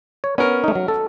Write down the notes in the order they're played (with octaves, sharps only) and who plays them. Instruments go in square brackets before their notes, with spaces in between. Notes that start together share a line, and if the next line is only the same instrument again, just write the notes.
[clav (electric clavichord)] C#5
[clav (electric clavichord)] B3 [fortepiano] C#4 A#4
[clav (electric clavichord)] A3 D#4
F#3
A4